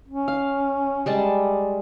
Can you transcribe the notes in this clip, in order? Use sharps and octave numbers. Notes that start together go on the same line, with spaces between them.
C#4
F5
G3 G#3 A5